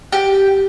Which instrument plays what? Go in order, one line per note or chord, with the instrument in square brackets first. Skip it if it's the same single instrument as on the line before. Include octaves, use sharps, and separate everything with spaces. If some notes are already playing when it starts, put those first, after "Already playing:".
[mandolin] G4